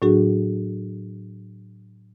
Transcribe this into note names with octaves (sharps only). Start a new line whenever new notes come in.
A2 F#3 D4 F#4 G#4